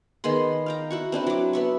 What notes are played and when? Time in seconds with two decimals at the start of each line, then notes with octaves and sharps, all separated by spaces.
0.24 D#3 B3 G#4 C6
0.66 F5 G5 A#5
0.91 E4 F#4 C#6
1.12 C4 D4 E4 B4
1.27 F#3 D6
1.53 B3 E5 C#6